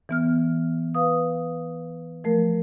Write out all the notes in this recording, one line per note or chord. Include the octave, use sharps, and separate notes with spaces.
E3 B3 F6
B4 F5 D#6
F3 A3 A#4